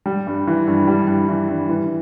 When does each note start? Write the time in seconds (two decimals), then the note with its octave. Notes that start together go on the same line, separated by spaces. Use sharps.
0.06 G3
0.27 G2
0.47 E3
0.68 G2
0.87 G3
1.07 G2
1.29 E3
1.49 G2
1.69 E3